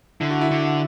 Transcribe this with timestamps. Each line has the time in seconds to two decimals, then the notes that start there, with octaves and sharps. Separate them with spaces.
0.20 D3 E4
0.31 F#4
0.41 E4
0.51 D3